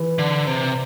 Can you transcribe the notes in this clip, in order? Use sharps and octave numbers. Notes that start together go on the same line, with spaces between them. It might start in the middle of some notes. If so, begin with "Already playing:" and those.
Already playing: E3
D3
C3